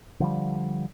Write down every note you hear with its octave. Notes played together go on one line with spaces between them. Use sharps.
D3 F3 G3